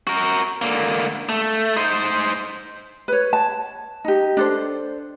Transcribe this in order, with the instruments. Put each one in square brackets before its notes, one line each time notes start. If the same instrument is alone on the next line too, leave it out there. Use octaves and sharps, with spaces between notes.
[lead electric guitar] F#4 A#4
D3 A#3
A3
D#4 C5
[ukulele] B4 C#5
A5
D#4 G4
D4 A4 C5